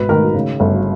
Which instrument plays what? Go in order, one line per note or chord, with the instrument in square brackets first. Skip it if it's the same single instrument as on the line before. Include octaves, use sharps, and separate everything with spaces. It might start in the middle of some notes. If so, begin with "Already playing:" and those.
Already playing: [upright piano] G#1 B2 B4
D#3 A#4
C#3
G1